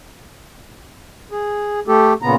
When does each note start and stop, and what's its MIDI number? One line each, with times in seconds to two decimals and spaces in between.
1.31 1.80 68
1.88 2.13 57
1.88 2.13 67
1.88 2.13 69
2.22 2.35 46
2.22 2.35 49
2.22 2.35 59
2.22 2.35 82